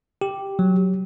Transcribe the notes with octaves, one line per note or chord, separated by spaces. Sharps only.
G4
F#3